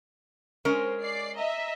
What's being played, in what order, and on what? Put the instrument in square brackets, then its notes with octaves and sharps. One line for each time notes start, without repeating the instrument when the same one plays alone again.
[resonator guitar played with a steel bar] G#3 C#4 A#4 [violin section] C5
[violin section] D5 C7
D#5 E5 A#5